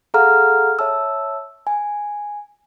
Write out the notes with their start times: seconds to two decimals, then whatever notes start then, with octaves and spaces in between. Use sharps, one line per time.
0.14 G#4 A4 F5 F#5 A#5 F6
0.79 C#5 E5 A5 E6
1.67 G#5